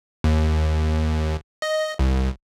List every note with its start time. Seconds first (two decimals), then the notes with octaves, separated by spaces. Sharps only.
0.24 D#2
1.62 D#5
1.99 C2